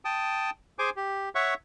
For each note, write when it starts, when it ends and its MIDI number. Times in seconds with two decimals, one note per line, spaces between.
0.05 0.50 79
0.05 0.50 81
0.05 0.50 87
0.79 0.90 68
0.79 0.90 72
0.79 0.90 80
0.79 0.90 86
0.96 1.29 67
1.35 1.54 73
1.35 1.54 76
1.35 1.54 78
1.35 1.54 85